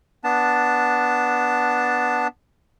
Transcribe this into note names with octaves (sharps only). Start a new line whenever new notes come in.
B3 D4 A5